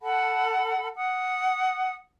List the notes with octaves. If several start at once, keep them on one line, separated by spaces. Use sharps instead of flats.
A4 F#5 A5 B5
F#5 D#6